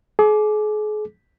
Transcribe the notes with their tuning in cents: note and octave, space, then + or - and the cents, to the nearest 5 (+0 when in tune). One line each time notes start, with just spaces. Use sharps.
G#4 +40 D6 +0